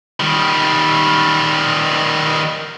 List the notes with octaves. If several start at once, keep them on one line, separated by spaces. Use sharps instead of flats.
D#3 G3